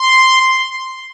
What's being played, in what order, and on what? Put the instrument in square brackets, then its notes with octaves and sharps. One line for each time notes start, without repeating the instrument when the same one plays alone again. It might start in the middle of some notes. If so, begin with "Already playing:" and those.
Already playing: [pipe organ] C6